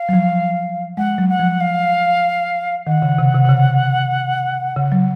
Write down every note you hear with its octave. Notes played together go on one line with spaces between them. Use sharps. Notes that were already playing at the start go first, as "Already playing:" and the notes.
Already playing: F5
F#3
F3
G#3 F#5
F#3
F#5
F3
F5
D#3 F#5
C#3
C3
C3
C3
C#3
C#3
F#3